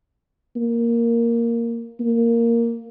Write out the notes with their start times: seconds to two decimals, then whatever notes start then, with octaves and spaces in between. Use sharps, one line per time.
0.56 A#3
2.00 A#3